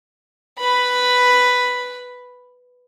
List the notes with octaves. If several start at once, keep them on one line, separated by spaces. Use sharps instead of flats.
B4 B5